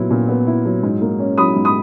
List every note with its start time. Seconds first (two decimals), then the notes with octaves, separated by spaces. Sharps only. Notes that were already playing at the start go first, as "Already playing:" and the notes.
Already playing: A#2 F#3 B3 E4
0.11 A#2
0.29 B3
0.47 E4
0.65 F#3
0.83 G#2
1.01 A#3
1.19 C#4
1.38 F#3 B5 D#6
1.56 G#2
1.65 B5 D#6